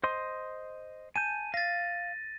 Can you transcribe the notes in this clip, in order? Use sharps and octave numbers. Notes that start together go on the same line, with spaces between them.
C5 D#5 C6
G#5 A5 G6 D#7
F5 A6 A#6